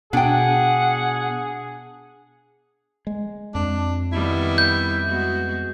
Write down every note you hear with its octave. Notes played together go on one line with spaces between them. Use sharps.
B2 D4 G#4 F#5 G5
G#3
F2 D4
D#3 G3 B3 E4
G6
G#3 B3 F#4